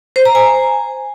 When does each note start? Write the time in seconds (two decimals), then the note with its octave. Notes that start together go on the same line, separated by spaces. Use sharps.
0.16 C5
0.25 A#5
0.35 G#5